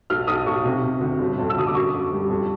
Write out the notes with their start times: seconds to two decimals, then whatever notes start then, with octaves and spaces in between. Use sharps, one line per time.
0.10 B1 F6
0.27 B1 D#6
0.46 B1 C#6
0.65 C3
0.83 C3
1.01 D2
1.19 G1
1.39 F2
1.50 E6
1.56 G1 D#6
1.67 D6
1.75 F#2 C#6
1.93 F#2
2.12 G3
2.30 F2